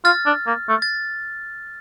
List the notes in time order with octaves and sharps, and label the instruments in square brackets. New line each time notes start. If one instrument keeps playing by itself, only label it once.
[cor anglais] F4 [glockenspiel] F6 A6
[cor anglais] D4
A#3
A3
[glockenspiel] A6